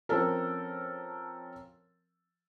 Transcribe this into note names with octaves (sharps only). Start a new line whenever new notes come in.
F3 C4 C#4 A4 A#4